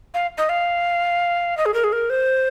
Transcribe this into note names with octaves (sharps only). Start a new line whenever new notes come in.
F5
D#5
F5
D#5
G#4
A#4
G#4
A#4
C5